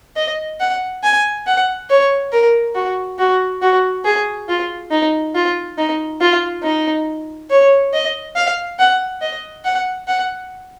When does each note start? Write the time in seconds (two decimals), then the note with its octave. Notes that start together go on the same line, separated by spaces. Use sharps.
0.16 D#5
0.60 F#5
1.03 G#5
1.47 F#5
1.90 C#5
2.32 A#4
2.75 F#4
3.19 F#4
3.62 F#4
4.05 G#4
4.48 F4
4.91 D#4
5.35 F4
5.78 D#4
6.21 F4
6.63 D#4
7.50 C#5
7.93 D#5
8.36 F5
8.79 F#5
9.22 D#5
9.65 F#5
10.08 F#5